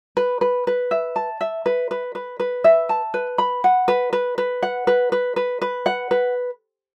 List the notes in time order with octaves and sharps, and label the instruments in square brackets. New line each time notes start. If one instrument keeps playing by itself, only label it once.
[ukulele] B4
B4
B4
E5
A5
E5
B4
B4
B4
B4
E5
A5
B4
B5
F#5
B4
B4
B4
F#5
B4
B4
B4
B4
F#5
B4